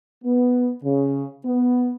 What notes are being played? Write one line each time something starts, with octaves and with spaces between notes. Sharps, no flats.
B3
C#3
B3